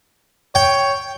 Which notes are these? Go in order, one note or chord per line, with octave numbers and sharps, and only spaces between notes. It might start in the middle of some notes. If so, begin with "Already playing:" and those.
C#5 G5